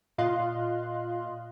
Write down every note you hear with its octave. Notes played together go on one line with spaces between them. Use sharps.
A#2 F4 D#5 F5 C6 F#6